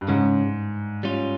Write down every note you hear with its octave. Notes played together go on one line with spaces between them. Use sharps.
G2
G#2 C#3 G#3 C#4
G3 C#4 F4